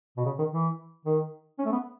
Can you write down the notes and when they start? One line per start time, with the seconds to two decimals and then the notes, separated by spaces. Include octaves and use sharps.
0.17 B2
0.25 C#3
0.38 D#3
0.52 E3
1.05 D#3
1.58 C#4
1.65 A3
1.72 B3